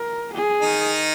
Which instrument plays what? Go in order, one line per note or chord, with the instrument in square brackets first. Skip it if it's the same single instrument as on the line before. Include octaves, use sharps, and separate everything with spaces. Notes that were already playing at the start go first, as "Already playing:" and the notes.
Already playing: [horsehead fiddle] A#4
G#4
[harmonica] D#3 D#4